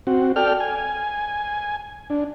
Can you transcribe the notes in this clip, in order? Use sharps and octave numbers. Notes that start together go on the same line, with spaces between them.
C4 F#4
A4 D5 G5 F6
G#5
D4